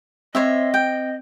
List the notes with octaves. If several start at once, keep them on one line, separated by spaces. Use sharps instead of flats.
C4 C5 C#5 D#5 E5
G5